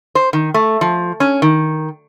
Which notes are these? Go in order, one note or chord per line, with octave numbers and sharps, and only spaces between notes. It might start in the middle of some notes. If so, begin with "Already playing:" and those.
C5
D#3
A3
F3
C#4
D#3